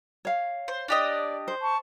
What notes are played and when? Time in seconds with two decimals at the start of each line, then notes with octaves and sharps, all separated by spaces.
0.25 C#5 F5
0.68 C5
0.88 D4 G4 D5 D#5
1.48 C5
1.61 A5 C#6